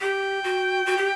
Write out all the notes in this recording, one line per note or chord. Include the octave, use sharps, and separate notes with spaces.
G4 G5
F#4
F#4
G4